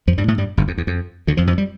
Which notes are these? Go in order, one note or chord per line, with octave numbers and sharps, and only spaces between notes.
F2 F3
G2 G3
A2 A3
G2 G3
G1 G2
F2
E2
F2
D2 D3
F2 F3
F2 F3
G3